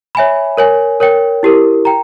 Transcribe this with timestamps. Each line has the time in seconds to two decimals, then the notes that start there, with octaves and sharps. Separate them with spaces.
0.15 C#5 E5 G#5 B5
0.57 A#4 C#5 G#5
1.00 A#4 C#5 G5
1.43 E4 G4 A#4
1.85 G5 A#5